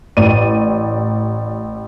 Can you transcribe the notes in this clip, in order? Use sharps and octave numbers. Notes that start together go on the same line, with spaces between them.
A1 D5 D#7